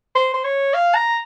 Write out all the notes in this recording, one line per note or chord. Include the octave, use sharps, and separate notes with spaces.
C5
C5
C#5
F5
A#5